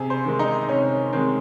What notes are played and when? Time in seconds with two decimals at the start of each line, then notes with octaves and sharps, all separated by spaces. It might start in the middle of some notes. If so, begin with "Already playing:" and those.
Already playing: C3 G#4
0.10 C5
0.25 D#3 G#3
0.39 D#4
0.69 C3 C#4
1.13 D#3 G#3 C4